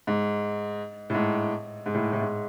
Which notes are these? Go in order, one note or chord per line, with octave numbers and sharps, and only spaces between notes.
G#2
A2
G#2
G#2
A2
A2
G#2